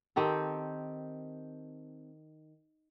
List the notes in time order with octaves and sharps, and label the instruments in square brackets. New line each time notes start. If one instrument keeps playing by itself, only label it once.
[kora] D#3 C4 G4 A4